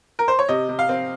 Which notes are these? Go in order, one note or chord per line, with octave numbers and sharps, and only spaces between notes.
A#4
C5
C#5
C3 D#5
C3
F5
C4